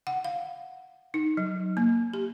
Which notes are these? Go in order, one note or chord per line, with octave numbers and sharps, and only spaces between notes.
F#5
F5
D#4
F#3
A#3
G4